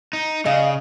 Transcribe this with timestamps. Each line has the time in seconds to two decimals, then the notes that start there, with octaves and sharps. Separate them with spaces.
0.13 D#4
0.46 C#3 D#5 F5